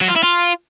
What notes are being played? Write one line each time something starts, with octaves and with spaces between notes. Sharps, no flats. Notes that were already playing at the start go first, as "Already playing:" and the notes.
F#3
F4
E4
F4